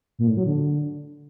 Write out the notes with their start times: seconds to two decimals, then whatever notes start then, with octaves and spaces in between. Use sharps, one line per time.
0.19 A#2
0.28 A2
0.37 F#3
0.46 D3